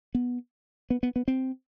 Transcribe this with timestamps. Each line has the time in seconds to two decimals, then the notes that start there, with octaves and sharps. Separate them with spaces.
0.15 B3
0.90 B3
1.03 B3
1.16 B3
1.28 C4